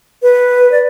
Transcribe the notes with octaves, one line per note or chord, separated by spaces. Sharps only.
B4
D5